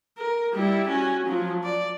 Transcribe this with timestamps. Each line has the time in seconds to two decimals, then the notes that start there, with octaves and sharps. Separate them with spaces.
0.18 A#4
0.53 G3 E4
0.88 C#4 F#4
1.26 F3 F#3
1.63 D5